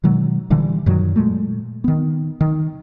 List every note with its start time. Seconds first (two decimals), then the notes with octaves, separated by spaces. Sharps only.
0.04 B2 D#3 F#3 G#3
0.50 A#2 D3 E3 G3
0.86 F#2 A#2 D#3 F#3
1.16 A#2 F#3 G#3 A3
1.84 D#3 B3
2.41 D#3